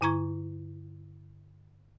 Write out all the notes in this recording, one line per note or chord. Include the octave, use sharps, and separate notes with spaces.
G2 D3 E4 A#5 C#6 G#6